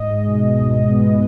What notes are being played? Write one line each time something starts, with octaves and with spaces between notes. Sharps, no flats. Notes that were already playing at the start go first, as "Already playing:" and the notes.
Already playing: G#2 D#5
G#3
B2
B2
C#2
G#3
B3